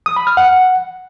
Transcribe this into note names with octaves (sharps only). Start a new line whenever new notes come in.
D#6
B5
F6
F#5